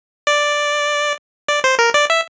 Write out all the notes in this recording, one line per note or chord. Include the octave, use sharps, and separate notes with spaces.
D5
D5
C5
A#4
D5
E5